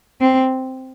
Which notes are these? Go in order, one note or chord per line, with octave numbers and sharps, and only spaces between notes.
C4